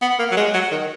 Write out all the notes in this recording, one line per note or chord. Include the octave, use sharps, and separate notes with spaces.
B3
A#3
F#3
G#3
F#3
D#3